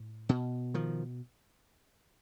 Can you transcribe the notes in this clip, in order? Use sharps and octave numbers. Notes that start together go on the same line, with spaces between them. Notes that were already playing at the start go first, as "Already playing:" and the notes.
Already playing: A2
B2
D#3 F3